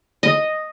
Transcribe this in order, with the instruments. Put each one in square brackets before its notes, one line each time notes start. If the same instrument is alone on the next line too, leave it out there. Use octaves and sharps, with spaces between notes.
[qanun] D#5